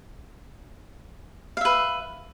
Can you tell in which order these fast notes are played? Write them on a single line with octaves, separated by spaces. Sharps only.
F5 E5 B4